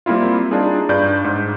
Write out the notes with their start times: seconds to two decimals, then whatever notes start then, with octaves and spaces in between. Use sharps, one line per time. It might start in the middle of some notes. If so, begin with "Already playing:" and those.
0.06 G3 A#3 C4 E4 F4
0.51 D4 D#4 F4 G#4
0.89 G2 D5 G6
1.24 G#2